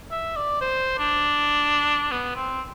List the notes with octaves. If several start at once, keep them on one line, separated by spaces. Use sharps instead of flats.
E5
D5
C5
D4
B3
C4